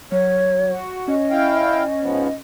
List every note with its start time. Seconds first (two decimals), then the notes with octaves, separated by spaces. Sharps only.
0.12 F#3 C#5
0.71 F#4
1.08 C#4 D#5
1.31 E4 F5 G5
2.01 G#2 F3 B3